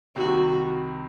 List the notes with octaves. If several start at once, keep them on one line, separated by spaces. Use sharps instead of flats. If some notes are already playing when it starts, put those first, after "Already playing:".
C2 C3 D#3 F#4